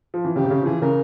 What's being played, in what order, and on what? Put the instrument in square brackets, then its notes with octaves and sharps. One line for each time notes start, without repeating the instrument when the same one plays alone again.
[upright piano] F3
E3
[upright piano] C#3 [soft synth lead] G4
[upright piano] C3
C#3
F3
[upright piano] E3 [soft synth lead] G#4
[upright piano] C#3 [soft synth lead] A#4